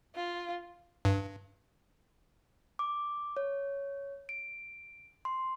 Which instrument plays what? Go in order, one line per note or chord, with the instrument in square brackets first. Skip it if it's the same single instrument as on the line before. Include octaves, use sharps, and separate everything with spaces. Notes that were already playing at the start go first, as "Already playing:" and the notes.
[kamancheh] F4
[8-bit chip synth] G2
[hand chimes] D6
C#5
D7
C6